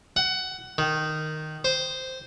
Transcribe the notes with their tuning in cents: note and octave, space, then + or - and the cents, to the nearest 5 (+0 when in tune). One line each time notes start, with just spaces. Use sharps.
F#5 +15
D#3 -5
C5 -5